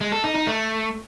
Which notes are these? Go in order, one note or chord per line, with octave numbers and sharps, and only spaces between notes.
G#3
A4
D#4
D#4
A3